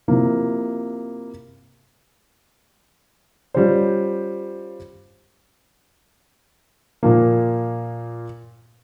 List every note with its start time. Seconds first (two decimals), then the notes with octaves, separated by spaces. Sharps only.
0.08 C3 F3 A#3 E4
3.54 G3 C#4 F4 C5
7.03 A#2 F3 A#3